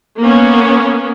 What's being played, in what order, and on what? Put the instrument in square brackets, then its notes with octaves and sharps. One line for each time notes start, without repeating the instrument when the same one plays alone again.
[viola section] A#3 B3 C#4